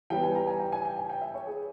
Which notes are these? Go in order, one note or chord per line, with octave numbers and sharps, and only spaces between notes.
E3 G3 B3 G5
G#5
A#5
G#5
G5
G#5
G5
G#5
G5
E5
C#5
G#4